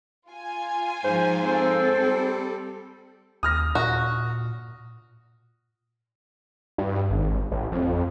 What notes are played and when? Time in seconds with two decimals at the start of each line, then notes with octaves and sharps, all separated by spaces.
0.30 F4 G#5
1.04 G#2 F3 C5
1.45 C4 A4 C5
2.01 G3
3.43 D#2 D#6 F6 A#6
3.75 A#2 F#4
6.78 G2
7.10 G#1
7.52 A1
7.72 F2